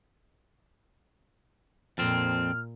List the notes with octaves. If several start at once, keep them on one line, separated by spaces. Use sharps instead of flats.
F2 A#2 C4 F6